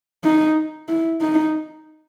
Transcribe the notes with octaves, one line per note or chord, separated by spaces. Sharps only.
D#4
E4
D#4